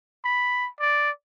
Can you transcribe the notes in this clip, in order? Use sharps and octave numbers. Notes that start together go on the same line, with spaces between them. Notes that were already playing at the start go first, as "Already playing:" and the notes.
B5
D5